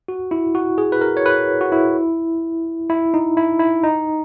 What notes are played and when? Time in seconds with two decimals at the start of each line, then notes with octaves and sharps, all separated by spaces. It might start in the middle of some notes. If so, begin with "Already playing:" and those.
0.08 F#4
0.31 E4
0.55 F#4
0.78 G#4
0.92 B4
1.01 A#4
1.17 C#5
1.26 B4
1.61 F#4
1.72 E4
2.90 E4
3.14 D#4
3.37 E4
3.60 E4
3.83 D#4